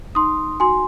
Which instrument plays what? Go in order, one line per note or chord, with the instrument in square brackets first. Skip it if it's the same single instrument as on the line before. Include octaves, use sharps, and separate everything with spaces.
[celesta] D#4 C6 D#6
F#4 G#5 C6